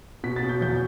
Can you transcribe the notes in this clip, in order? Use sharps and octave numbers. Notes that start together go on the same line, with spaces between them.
B2 B6
A6
B2
G6
E2 G6